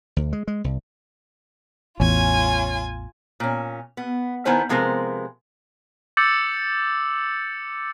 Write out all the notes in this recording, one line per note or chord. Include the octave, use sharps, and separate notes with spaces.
D2
G#3
G#3
C2
A1 E2 C#4 F4 G#5
A#2 C#4
B3
D#3 B3 E4 C5 G#5
C3 F3 G#3 B3 A#4 C5
D6 E6 G6 A6 C#7 F#7